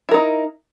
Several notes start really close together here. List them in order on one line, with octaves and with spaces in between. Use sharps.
E4 A#4 D#4